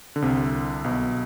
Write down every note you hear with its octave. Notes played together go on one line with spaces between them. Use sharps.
D3
C2 C3
B1 B2